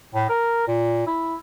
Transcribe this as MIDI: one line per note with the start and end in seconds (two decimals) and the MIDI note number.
0.15 0.26 45
0.29 0.63 70
0.68 1.07 46
1.07 1.36 64